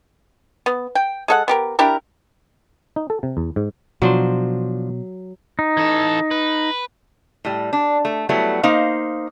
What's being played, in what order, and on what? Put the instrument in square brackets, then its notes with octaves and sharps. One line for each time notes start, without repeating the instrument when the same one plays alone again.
[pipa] B3
G5
G#3 A4 F#5
B3 G4 A#4
D4 E4 G4 A#4
[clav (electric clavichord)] D#4
A4
C3
E2
G#2
[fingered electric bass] B2 [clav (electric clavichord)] F3 D4 C5 [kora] F#3
[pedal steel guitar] D#4
[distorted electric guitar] E3 A4
B4
[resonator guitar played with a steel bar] A2 G3
D4
A3
F#3 G3 A3 B3 E4
A#3 D#4 C5 F5